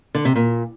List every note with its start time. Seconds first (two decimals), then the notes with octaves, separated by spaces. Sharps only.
0.15 D3
0.25 C3
0.36 A#2